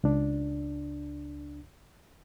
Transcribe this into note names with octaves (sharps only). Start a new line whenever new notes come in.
C#2 D4